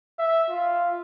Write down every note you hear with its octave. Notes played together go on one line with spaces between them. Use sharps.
E5
F4